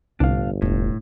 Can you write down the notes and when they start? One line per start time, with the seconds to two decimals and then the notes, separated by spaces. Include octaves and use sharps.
0.20 G1 C2 A2 D4 F5
0.62 E1 A1 A2